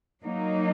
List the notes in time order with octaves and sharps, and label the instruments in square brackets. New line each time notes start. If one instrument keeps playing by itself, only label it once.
[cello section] F#3 A#3 D#4